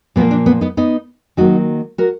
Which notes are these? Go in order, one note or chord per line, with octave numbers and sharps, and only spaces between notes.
A#2 F3 A#3 B3
D4
B3
B3 D#4
B3 D#4
D#3 F#3 A#3 D#4 F#4
F#4 A#4